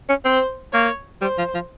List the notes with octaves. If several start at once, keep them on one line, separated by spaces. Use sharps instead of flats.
C#4
C4 C5
A#3 C#5
G3 C5
F3
F3